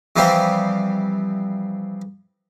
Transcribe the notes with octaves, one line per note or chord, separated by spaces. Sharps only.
C3 E3 F3 G3 C4